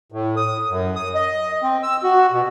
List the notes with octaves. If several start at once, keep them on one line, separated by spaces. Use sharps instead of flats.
A2
D#6
F#2
D#6
D#5
C4
E6
F#4
B2